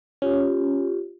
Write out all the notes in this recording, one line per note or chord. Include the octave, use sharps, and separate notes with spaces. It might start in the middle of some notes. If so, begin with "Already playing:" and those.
C#4 F4 G4